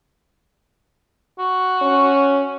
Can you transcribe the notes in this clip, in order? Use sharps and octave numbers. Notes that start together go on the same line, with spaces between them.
F#4
C#4